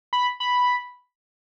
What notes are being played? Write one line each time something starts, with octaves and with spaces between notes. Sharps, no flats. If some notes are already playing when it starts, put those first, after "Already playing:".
B5
B5